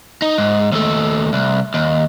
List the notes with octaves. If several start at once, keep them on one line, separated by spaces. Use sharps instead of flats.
D#4
G#2
D#2 A3
C2
D#2